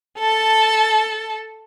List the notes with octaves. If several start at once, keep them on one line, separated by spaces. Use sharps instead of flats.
A4 A5